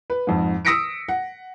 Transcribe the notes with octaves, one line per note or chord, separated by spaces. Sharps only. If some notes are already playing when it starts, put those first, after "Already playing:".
B4
F2 G#2
D#6 E6 A#6 B6 C#7 D7
F#5